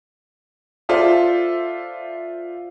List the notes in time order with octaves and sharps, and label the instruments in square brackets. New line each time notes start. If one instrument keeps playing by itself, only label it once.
[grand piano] F4 A4 C5 D5 E5